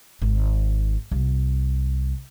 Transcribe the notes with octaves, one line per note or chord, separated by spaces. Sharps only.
G#1
C2